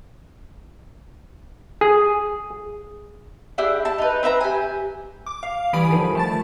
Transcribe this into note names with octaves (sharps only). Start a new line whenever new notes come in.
G#4
D4 E4 G4 G#4
A5
D#4 B4
C4 B4 E5 A#5
G4 G#5
D6
F5
E3 G3 G#5 B5 D#6 D7
D3 D#3 F3
A3 A5 A6